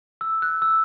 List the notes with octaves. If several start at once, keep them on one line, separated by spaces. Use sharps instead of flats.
E6
F#6
E6